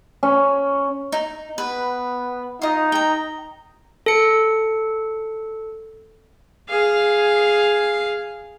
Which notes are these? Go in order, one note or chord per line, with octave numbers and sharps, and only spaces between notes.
C#4
D#4
B3 B4
D#4 F4 D#5
G5 A#5
A4 C#7
G#4 F5